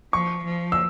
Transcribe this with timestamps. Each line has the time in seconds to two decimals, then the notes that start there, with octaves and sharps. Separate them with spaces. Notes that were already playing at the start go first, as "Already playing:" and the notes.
0.13 F3 C#6
0.45 F3
0.72 E6